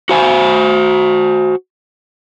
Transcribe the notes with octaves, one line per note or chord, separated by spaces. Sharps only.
F#4 C5 G#5